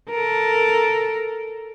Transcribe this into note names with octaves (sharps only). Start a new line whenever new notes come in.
A4 A#4